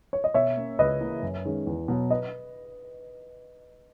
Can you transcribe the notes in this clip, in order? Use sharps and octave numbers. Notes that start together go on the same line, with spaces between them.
C#5
D#5
B2 C#5 E5
A#3 C#4
C#2 B4 D#5
C#3 E3 A#3
F#2
D#3 G#3 C#4
E2
B2 F#3 B3
B4 D#5